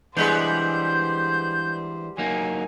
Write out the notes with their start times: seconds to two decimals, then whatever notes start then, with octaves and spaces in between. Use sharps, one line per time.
0.17 E3 G3 G#3 B3 D4 C5 G6
2.18 F#3 A#3 D#4 G#5